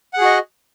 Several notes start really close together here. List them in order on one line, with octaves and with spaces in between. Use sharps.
F#5 G#4 F#4 D#5